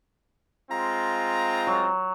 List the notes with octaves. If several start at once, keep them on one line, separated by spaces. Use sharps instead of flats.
G#3 C4 F4 A#5
F#3